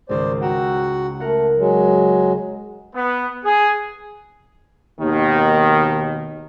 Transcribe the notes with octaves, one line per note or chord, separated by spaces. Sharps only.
G#1 C#2 C5 D5
F#4 F#5 G5 A#5 E6
A3 A#4 F#5
F#3 G#3
B3
G#4
D#2 B2 D#3